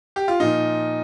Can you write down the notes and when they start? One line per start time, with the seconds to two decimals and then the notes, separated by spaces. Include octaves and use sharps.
0.16 G4
0.28 F4
0.40 A#2 F3 D#4